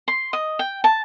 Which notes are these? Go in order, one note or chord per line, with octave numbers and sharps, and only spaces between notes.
C6
D#5
G5
A5